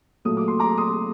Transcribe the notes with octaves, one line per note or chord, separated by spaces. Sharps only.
A#2 F#3 A3 D#6
D6
C6
A#5 D6
C6 D#6